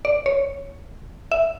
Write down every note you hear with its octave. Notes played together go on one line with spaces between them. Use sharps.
D5
C#5
E5